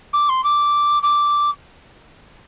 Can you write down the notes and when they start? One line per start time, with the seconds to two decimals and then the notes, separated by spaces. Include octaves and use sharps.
0.13 D6
0.29 C6
0.44 D6
1.03 D6